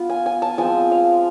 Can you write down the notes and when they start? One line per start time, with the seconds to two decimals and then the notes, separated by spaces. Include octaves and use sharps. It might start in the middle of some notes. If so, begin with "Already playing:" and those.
Already playing: B3 F4
0.10 G#5
0.26 G#5
0.42 A5
0.58 F3 G#3 C4 G#5
0.92 F5